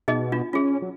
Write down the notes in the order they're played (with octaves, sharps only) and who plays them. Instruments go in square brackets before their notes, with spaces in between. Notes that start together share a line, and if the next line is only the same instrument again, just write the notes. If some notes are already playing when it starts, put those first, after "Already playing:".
[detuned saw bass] B2 [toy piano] D#4 G#4 D#5
[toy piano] D4 F4
[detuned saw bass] C#4 [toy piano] F4 G#4
[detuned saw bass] F#3